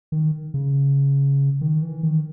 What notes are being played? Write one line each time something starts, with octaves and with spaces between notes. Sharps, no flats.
D#3
C#3
D#3
E3
D#3